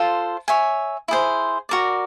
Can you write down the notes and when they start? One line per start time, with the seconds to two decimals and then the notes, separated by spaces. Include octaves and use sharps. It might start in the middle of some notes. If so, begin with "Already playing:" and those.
Already playing: F4 A4 C5
0.48 C#5 E5 G#5
1.08 E4 G#4 C5
1.69 F#4 A#4 D5